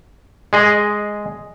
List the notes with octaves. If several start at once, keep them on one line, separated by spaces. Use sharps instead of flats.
G#3 G#4 D#5